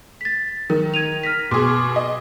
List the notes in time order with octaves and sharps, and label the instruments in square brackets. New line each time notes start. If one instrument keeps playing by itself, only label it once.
[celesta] A6 B6
[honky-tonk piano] D#3 [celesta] A#4
[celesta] G#6 D#7 F7
F6 A#6 B6
[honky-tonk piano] B2 G#4 [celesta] C6 D6
[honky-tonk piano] D#5